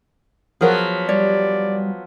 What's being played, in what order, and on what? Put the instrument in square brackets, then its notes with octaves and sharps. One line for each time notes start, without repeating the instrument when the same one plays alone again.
[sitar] F3 F#3 B3 [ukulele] G#4 A#4
[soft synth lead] G3 [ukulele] C#5 [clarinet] D5